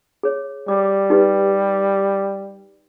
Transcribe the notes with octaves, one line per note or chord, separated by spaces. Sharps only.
G#4 C#5
G3 D6
D#4 G4 B4